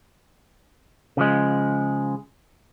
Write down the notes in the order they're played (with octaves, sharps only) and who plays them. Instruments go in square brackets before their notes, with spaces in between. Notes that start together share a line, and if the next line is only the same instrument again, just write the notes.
[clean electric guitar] C#3 F3 G#3